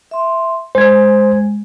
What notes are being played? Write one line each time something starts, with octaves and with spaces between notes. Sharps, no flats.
E5 C6
G#3 C5 G#6